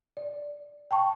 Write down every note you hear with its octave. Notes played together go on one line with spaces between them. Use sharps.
D5
G5 A5 C#6